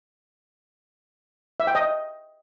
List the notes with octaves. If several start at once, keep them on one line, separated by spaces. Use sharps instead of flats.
E5
G5
D#5